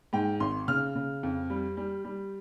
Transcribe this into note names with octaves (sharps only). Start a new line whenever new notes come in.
G#2 G5
G#1 C6
C#3 F6
C#3
F2
G3
G3
G3